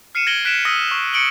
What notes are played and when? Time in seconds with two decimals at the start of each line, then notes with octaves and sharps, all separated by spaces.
0.15 F6 C7 C#7 D#7 E7
0.27 G#6 A#6 D7 F#7 G7
0.45 F#6 B6 D7 E7
0.65 D#6 E6 A#6 D#7
0.91 C#6
1.13 C#6 C#7 D7 F#7 G7